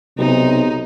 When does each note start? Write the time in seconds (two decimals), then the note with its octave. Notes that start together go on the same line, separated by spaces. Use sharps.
0.18 B1 C3 D#4